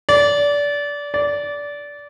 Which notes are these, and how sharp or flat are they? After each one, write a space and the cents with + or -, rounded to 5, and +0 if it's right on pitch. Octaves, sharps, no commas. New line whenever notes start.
D5 -25
D5 -20